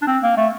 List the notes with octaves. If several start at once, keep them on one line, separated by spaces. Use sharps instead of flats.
D4
C4
A#3
A3